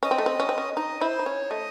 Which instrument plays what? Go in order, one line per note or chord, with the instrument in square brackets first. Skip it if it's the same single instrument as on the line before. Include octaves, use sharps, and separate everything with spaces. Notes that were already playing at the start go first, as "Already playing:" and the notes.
[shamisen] C#4 [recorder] D#5
[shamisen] C4
A3
C4
C#4
C4
C#4
[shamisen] D#4 [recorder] D#5
[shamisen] E4 [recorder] C5
[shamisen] D#4
[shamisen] C#4 [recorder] C#5
[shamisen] A3 [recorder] D#5